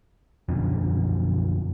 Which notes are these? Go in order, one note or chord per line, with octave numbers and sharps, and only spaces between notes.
F#2 B2 D3 F3